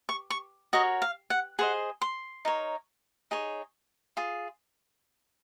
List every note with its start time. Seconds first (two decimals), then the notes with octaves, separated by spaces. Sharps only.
0.09 C#6
0.30 C#6
0.73 F#4 A#4 C#5 D#5
1.02 F5
1.30 F#5
1.59 G#4 C5 D#5 F#5
2.02 C6
2.45 D#4 A#4 C#5
3.31 D#4 G#4 C#5
4.17 F4 G#4